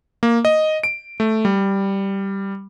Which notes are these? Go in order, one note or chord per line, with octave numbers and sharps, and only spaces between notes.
A#3
D#5
D7
A3
G3